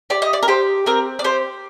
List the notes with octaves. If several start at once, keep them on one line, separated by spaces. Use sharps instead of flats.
G4 D5
D#5
D5
A#4
G4 C5
C4 A#4
D5
G4 C5